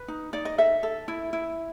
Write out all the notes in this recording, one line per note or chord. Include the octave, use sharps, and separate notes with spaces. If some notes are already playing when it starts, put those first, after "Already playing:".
Already playing: B4
D#4
D#4 D5
D#5
A4 E5
A4
E4
E4